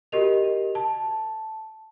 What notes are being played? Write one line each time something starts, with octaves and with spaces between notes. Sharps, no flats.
F#4 G4 A#4 D#5 F7
A5